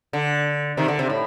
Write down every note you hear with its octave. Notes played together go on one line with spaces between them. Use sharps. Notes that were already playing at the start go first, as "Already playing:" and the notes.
D3
C3 D#3
D3
C3
A2